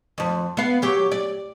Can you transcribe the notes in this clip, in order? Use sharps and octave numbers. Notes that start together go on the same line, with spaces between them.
F2 F3
B3 F5
F#3 G4
D5